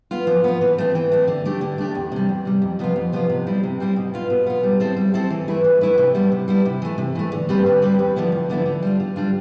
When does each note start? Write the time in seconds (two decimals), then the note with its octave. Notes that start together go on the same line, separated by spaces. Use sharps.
0.11 B3 F4
0.27 F3
0.44 B3 F4
0.61 E3
0.78 A3 C4
0.95 E3
1.12 A3 C4
1.28 D3
1.45 A3 D4 G4
1.61 D3
1.78 A3 D4 G4
1.95 E2
2.12 C3 G3
2.29 E2
2.45 C3 G3
2.62 F2
2.79 C3 F3 B3 F4
2.96 F2
3.12 C3 F3 B3 F4
3.29 C3
3.46 G3 C4 E4
3.63 C3
3.80 G3 C4 E4
3.96 B2
4.14 B3 F4
4.30 B2
4.46 B3 F4
4.63 G3
4.80 C4 E4 A4 C5
4.97 G3
5.14 C4 E4 A4 C5
5.30 E3
5.48 A3 E4 B4
5.64 E3
5.81 A3 E4 B4
5.98 C3
6.15 G3 B3 E4
6.32 C3
6.48 G3 B3 E4
6.65 C3
6.82 E3 A3
6.98 C3
7.15 E3 A3
7.32 D3
7.49 G3 C4 G4 B4
7.66 D3
7.82 G3 C4 G4 B4
7.99 E2
8.16 D3 F3 B3 E4
8.32 E2
8.49 D3 F3 B3 E4
8.66 D3
8.83 G3 D4 F4
9.00 D3
9.16 G3 D4 F4